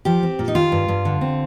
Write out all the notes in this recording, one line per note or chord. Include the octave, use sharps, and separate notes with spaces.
F3 G4
C4
A#2
D#4
D#3 F4
G2
G2
D3
C4